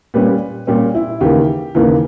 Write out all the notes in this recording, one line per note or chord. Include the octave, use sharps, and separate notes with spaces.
A#2 G3 C#4 B4
A#2 G3 C#4 G4
E4
D#2 C#3 E3 A#3 G4
D#2 C#3 E3 A#3